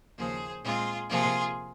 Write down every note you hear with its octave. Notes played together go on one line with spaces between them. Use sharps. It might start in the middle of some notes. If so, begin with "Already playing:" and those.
D#2 C#3 F3 A#3 G#4 C5
A#2 G#3 C4 F4 G#4
C3 F3 A#3 F4 G#4